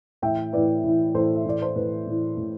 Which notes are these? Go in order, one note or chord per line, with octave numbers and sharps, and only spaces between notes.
A2 E3 E5 G5
A2 E3 B4 D5
A2 E3
A2 E3 A4 C5
E5
A2 E3 D5
C5
A2 E3 B4
A2 E3
A2 E3